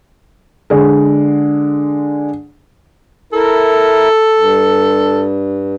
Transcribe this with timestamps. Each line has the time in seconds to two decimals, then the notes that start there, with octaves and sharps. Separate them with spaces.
0.70 D3 G#3
3.33 E4 A4 A#4
4.37 G2